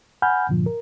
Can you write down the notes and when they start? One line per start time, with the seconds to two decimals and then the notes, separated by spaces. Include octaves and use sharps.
0.22 F#5 G#5 B5 F6 G6
0.49 G2 A#2 D3 F3
0.66 A#4